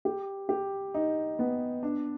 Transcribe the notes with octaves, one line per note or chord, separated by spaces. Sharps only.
G4
G4
D#4
B3
D4